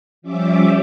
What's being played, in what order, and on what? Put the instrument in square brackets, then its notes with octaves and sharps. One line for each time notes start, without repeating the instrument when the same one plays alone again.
[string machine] F3 G3 C#4 E5 D6